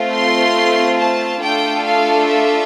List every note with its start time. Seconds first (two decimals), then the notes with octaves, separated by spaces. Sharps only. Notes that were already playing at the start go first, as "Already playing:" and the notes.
Already playing: A3 C4 F4
0.10 C6
0.96 A5
1.40 A3 D4 F4 A4 G5
1.83 F5
2.27 E5